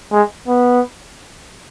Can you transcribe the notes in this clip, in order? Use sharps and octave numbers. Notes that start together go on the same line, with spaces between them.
G#3
B3